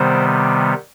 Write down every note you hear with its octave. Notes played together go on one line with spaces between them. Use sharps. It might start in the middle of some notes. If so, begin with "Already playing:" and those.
Already playing: C3 D#3 G3 B3 C5